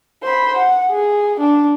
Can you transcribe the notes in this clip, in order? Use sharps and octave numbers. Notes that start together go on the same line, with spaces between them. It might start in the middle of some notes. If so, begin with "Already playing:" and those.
C5 B5
F#5
G#4
D4